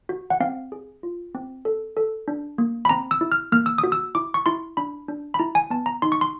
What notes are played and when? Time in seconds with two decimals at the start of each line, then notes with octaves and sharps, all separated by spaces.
0.09 F#4
0.30 F#5
0.40 C4 F5
0.72 G#4
1.03 F4
1.35 C4
1.65 A4
1.97 A4
2.28 D4
2.58 A#3
2.85 B5
2.89 C4 A#5
3.11 E6
3.21 E4
3.32 F6
3.52 A#3 F6
3.66 E6
3.78 D#6
3.84 F#4
3.92 E6
4.15 E4 D6
4.34 C#6
4.46 E4 C6
4.77 D4 B5
5.08 D4
5.34 B5
5.39 E4 A#5
5.55 G#5
5.70 B3 A5
5.86 A#5
6.02 D#4 C6
6.12 C#6
6.21 C6